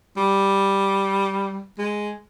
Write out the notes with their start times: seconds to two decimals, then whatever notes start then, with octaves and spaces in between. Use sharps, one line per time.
0.17 G3
1.78 G#3